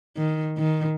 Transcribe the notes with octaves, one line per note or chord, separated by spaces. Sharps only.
D#3
D#3